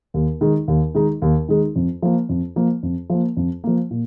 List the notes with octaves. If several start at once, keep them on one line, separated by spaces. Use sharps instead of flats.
D#2
D#3 G#3 D#4
D#2
D#3 G#3 D#4
D#2
D#3 G#3 D#4
F2
F3 A#3
F2
F3 A#3
F2
F3 A#3
F2
F3 A#3
A#2